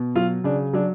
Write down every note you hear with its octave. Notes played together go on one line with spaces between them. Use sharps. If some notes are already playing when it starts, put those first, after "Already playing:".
Already playing: B2
F#3 F4
C#3 D4
F#3 D4